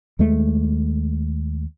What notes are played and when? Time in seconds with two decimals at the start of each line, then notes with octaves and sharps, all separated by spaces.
0.19 D#2 G#3 A3